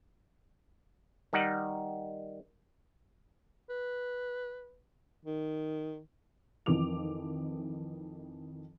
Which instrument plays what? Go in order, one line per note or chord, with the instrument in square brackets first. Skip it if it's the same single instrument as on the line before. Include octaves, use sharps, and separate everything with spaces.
[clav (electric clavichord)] D#3 G3 D#4 F#5
[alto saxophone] B4
D#3
[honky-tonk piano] F2 D#3 E3 D6 F7